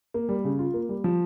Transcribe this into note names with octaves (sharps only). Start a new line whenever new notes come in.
A#3
G3
C#3
F4
A#3
G3
F3